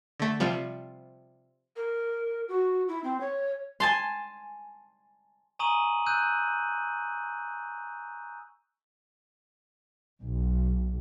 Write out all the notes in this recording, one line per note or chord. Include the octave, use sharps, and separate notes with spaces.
D3 A3
C3 F3 G3
A#4
F#4
E4
C4
C#5
G#5 A5 C6
G#5 A#5 C#6 D#6 D#7 F#7
E6 F#6 G6 D#7
B1